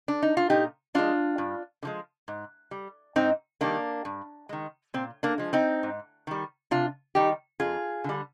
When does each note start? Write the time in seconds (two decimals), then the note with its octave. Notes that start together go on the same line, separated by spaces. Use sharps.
0.08 D4
0.22 D#4
0.37 F4
0.50 A#2 D#4 G4
0.94 F3 G#3 D4 F4
1.38 G2
1.83 D3 F3 G#3
2.28 G#2
2.71 G3
3.16 G#2 C4 D#4
3.61 D#3 G3 A#3 D4
4.05 G2
4.49 D#3 G#3
4.94 A#2 C4
5.23 A#3 D4
5.38 F3 G#3
5.53 C4 D#4
5.83 G#2
6.27 D#3 G3
6.71 C3 D4 F4
7.15 D#3 G3 D#4 G4
7.60 F2 F4 G#4
8.04 D3 G3